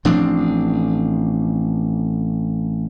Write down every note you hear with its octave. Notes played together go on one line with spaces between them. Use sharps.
A1 F3 C4 D4